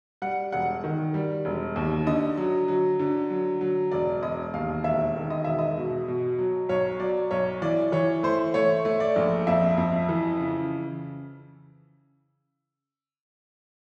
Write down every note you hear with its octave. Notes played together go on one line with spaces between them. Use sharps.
G3 F#5
E1 F#5
D#3
G3
E1
D#2
D3 D#5
F#3
F#3
D3
F#3
F#3
E1 D5
E1 D#5
D#2 F5
E1 E5
D#3
D#5
E1 E5
D#5
B2
B2
F#3
B1 C#5
F#3 D5
B1 C#5
E3 D5
E3 C#5
A3 C5
A3 C#5
A3
D5
A#1
F2 E5
F2
E3
C#3